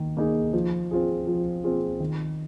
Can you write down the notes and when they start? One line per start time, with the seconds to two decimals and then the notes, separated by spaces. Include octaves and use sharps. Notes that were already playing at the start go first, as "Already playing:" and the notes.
Already playing: D#3 A#3
0.17 A#3 D#4 G#4
0.53 F3
0.91 C4 F4 G#4
1.27 F3
1.64 C4 F4 G#4
2.00 D#3